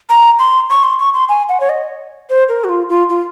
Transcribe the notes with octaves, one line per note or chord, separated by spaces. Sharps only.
A#5
C6
C#6
C6
C#6
C6
G#5
F#5
C#5
D#5
C5
A#4
F#4
F4
F4
F4